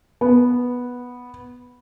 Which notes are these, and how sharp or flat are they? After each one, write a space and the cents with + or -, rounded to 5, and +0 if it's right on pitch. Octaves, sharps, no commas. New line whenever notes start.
B3 -5